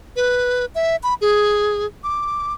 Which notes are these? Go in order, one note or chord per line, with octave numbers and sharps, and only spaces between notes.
B4
E5
B5
G#4
D6